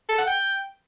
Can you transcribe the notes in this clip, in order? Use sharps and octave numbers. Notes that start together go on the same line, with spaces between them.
A4
F#5
G5